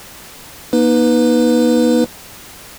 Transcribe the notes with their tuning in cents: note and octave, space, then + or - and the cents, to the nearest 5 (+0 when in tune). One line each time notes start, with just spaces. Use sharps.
A#3 +40 D#4 +0 B4 +0